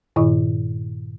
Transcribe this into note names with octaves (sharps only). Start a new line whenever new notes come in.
G2 A#2 D#3 E4 D#5 C#6